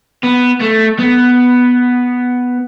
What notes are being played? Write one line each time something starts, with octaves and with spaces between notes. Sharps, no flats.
B3
A3
B3